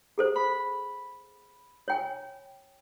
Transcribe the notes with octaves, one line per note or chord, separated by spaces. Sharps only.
G#4 A4 C5
B5
C#5 G5 G#5